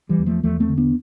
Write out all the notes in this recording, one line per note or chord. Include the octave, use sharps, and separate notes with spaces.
E3 G3
E2
F3 A3
E2 F3 A3
A3 C4
D3
B3 D4